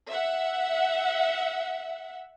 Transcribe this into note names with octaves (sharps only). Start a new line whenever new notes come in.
E5 F#5